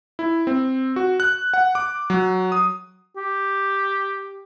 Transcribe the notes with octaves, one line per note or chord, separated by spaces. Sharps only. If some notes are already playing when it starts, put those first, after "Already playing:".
E4
C4
F#4
F#6
F#5
D6
F#3
D#6
G4